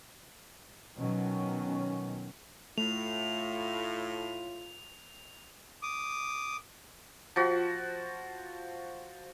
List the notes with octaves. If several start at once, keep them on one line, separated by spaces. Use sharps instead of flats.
B2 D#3 F#3 C#4
A2 A3 F4 F7
D6 D#6
F3 F#4